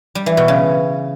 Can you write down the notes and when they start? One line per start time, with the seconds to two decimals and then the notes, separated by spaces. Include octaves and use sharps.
0.15 G3
0.26 E3
0.37 B2
0.48 C#3